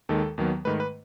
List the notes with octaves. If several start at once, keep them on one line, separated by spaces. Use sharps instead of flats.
D#2 D#3 G#3 A4
D#2 D#3 F#3 B3
G#2 D#3 A3 B4
B4